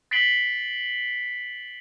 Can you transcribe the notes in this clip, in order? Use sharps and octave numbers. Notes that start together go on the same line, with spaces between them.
A6 B6 C7 D7 F#7 G7